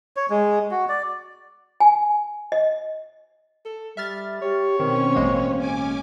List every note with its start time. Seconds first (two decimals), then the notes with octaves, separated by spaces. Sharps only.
0.17 C#5
0.30 G#3
0.71 F#4
0.89 D5
1.80 G#5
2.52 D#5
3.65 A4
3.97 G3 E5 F6 A6
4.41 G4 C#5
4.80 B2 D#3 C4 C#4
5.16 A1 G#3 A#3
5.55 C#4 G#5 D6